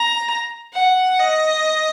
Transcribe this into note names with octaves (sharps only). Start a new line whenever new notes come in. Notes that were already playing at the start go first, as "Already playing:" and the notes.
Already playing: A#5
F#5
D#5